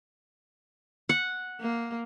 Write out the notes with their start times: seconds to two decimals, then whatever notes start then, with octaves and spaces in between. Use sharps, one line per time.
1.09 F#5
1.60 A#3